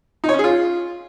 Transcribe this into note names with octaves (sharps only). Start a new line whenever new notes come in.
D#4
C#5
C#4
G#4
F4